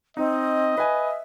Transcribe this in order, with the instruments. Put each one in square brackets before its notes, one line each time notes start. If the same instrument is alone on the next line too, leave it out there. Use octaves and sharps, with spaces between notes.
[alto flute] C4 [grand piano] D#4 [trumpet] D#5
[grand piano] B4 G#5 [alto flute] E5